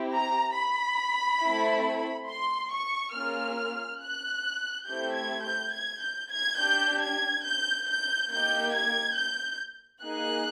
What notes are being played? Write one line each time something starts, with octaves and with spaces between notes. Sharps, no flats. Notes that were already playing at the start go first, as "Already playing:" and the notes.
Already playing: C4 E4 G4
A#5
B5
A3 C4 E4
C6
C#6
A#3 C#4 F4 G#4 F6
F#6
A3 C4 E4 G4 G6
G#6
G6
G#6
G6
G#6
D4 G4 G6
G#6
G6
G6
A#3 D#4 G4 G6
G#6
G6
A#3 D#4 G#4 F#6